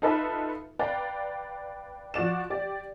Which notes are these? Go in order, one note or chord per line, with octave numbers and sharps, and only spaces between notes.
D#4 F4 A4 B4 E5 B5
B4 D5 F5 G5 A#5
F3 F#4 D5 E7
G4 D5